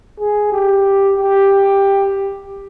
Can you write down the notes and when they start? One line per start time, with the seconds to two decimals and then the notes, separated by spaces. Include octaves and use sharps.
0.20 G#4
0.52 G4
1.17 G4